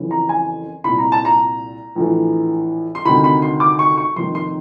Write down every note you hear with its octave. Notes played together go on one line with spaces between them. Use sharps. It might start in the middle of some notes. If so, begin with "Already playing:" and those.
Already playing: F#1 F2 C#3 E3
A#5
G#5
C2 A#2 B5
A#5
A5
A#5
A#1 A2 E3
C6
D2 C3 D#3 B5
B5
C6
D6
C#6
C#6
F1 D#2 D#3 C6
C6